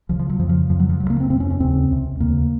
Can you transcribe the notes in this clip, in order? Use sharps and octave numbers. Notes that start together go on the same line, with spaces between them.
C#2 C#3 F3
F3
F#3
F2 C#3 F3
F3
F2 C#3 F3
F#3
F3
C#2 C#3 F#3
A#3
C4
F2 C3 C4
C#4
C#4
D#2 C#3 C4
C#2 C3
D#2 C#3 A#3